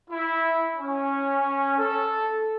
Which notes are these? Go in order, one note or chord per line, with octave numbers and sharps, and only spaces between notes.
E4
C#4
A4